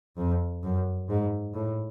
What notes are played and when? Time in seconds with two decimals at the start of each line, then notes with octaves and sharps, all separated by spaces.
0.17 F2
0.63 F#2
1.09 G#2
1.54 A2